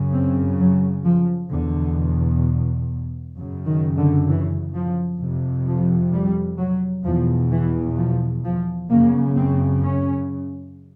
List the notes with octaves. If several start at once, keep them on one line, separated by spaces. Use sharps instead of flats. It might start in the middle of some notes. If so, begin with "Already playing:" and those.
Already playing: F#2 C#3
C4
F#3
F3
E2 B2 D3
F#2 C#3
D#3
D3
E3
F3
F2 C3
F3
G3
F#3
E2 B2 F3
E3
F3
F3
F#2 C#3 A#3
C4
C#4